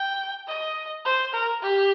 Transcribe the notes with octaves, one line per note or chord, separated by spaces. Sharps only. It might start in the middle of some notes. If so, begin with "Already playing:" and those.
Already playing: G5
D#5
C5
A#4
G4